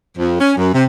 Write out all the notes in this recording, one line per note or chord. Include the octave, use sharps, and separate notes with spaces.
F2
C#4
F#2
C3